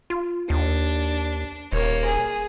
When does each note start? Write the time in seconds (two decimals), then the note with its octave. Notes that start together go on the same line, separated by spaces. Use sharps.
0.10 F4
0.50 D#2 D4
1.73 D#1 A#3 C#5
2.06 G#4